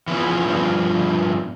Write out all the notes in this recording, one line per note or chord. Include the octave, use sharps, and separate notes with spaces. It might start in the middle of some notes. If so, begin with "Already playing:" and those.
E3 F3 B3 C#4
G2 B2 F3 G3